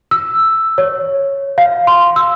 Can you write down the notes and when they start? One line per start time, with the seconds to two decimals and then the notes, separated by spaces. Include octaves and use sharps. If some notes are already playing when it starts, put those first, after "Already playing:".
0.11 E6
0.78 C#5
1.58 F5
1.87 C6
2.16 E6